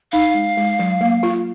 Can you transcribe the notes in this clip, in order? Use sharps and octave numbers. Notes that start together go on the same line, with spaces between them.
D#4 F5
G#3
G#3
F#3
A#3
F4